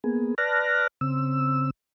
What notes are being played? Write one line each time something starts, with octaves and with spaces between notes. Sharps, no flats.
A#3 B3 G#4
B4 D5 A5 F6 F#6 A#6
C#3 C4 E6